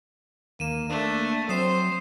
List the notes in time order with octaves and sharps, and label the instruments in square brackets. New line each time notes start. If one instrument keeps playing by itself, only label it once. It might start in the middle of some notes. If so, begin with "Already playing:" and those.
[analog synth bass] D#2 [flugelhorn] A#3 [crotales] D#7 E7
[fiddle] A3 [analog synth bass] A#3 [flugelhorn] D4
[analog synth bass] F#3 [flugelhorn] C4 [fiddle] C5 [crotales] D#6 C7 E7